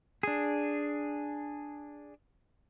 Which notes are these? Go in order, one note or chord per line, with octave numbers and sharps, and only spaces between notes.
D4 G#4